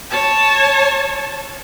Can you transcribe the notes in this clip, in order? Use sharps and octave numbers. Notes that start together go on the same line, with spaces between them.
C#5 A5